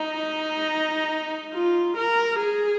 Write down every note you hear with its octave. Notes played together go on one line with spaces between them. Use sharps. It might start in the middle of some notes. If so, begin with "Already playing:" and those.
Already playing: D#4
F4
A#4
G#4